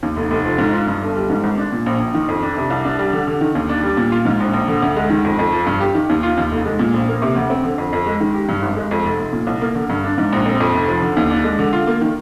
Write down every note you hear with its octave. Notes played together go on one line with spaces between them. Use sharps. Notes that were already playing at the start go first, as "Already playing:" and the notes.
D#2
F1
F1
F3
G#2
F4
G2
G1
G3
G#2
G#1
D4
A#2
A#1
A#1
D#3
F2
D4
C3
C2
D4
G3
D3
D3
D#3
D#2
D4
G3
A#2
F4
G#2
A#1
A#1
D3
D2
G#3
D#3
F2
F2
F3
G2
G4
D#3
D#2
F4
D#2
F1
G#3
A#2
A#1
A#3
C3
D2
C4
D3
F2
F2
G#3
D#3
G4
G2
G#1
G#3
F2
F1
F1
A#2
C2
A#3
D3
G2
D4
G#2
A#1
C4
F2
F1
F3
D3
D#2
D4
G#3
D3
F4
A#3
D#3